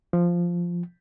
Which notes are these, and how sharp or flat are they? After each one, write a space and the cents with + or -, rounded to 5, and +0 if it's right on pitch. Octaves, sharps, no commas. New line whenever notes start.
F3 -5